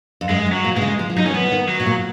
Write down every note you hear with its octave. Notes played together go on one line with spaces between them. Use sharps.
F2
F#2 G#3
F#2
F#3
A#2
B2 G#3
C#3
F3
F3
F#3 D#4
D#3 C#4
F3 B3
D#3
F#3
B2
A#2